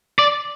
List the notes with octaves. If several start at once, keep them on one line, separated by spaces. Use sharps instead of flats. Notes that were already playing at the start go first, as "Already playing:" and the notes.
D5